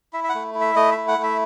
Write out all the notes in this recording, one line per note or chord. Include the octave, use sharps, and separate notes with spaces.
E4 E5
E5
F#5
A3
E4
E5
A3 D#5
E5
E4
F#5
A3
E5